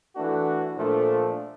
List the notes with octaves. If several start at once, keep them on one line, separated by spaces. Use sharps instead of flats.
E3 A3 D4 F#4
A#2 F3 A3 D4